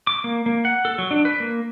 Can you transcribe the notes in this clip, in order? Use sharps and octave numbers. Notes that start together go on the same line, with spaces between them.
D6
A#3
A#3
F#5
A4
F#3
D4
B4
A#3